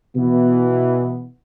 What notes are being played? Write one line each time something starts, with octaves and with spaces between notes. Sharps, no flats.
B2 E3 B3